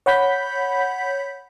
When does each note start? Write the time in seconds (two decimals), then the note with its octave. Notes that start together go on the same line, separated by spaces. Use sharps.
0.06 C#5 F#5 B5 G6 B6